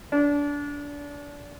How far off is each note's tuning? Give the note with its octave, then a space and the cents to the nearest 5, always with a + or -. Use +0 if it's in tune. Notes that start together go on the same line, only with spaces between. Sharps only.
D4 -25